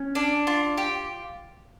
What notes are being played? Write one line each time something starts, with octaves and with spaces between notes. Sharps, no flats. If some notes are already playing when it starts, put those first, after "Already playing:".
Already playing: C#4
D4
F4
G4